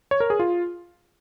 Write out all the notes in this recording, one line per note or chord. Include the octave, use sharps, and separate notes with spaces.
C#5
A#4
G#4
F4